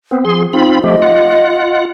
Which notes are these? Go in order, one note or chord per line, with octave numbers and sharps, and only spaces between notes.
B3 C4
F3 G#4 C6
C4 D#4 F4 B5
F3 A3 G4 D#5
F4 F#5